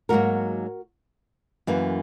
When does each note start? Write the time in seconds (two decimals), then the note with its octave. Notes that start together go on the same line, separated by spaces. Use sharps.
0.09 G#2 F#3 A#3 F#4 A#4
1.67 F#2 E3 A#3